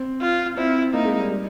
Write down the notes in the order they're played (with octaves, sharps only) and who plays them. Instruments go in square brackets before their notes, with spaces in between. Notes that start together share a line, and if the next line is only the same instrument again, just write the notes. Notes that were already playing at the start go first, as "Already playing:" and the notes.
Already playing: [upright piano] C4
[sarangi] F4
[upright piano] C4 [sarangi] E4
[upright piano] A#3 [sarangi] D#4
[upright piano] G#3
G3
G3